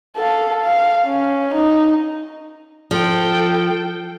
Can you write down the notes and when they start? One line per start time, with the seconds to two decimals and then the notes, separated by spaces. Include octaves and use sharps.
0.16 A4 F5
0.61 F5
1.06 C#4
1.54 D#4
2.91 F3 A4 G5